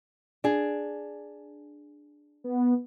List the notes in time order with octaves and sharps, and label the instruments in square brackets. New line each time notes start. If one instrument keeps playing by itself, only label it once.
[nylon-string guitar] D4 G#4
[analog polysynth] B3